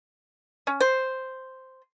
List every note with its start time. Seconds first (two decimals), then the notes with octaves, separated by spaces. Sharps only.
0.67 C#4
0.80 C5